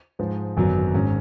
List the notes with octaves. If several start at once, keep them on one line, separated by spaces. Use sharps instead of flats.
G#2 F3 G#3
G#1 F#2 D3 F#3 B3
G#1 G#2 G#3 C#4